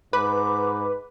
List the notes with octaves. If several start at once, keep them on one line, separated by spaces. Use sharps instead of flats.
G#2 B4 D6